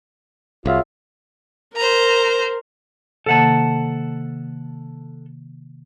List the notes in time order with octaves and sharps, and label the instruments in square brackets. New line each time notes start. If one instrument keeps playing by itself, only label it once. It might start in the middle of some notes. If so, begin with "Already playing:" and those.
[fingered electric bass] C2 [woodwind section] F#3 G#4 E5 [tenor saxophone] F4
[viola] A#4 [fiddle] C5 A#5
[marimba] C3 D#3 A#3 [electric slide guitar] A4 F#5 A5